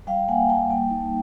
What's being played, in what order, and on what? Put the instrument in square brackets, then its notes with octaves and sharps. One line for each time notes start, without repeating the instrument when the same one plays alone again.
[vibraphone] G3 F5 G5
A#3 F#5 G#5
G3 G5 A5
A#3 G5 A5
D#4